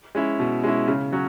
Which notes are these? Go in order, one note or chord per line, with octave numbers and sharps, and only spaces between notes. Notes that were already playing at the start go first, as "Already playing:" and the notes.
G#3 C#4 E4
B2
G#3 C#4 E4
C#3
F#3 C#4 F#4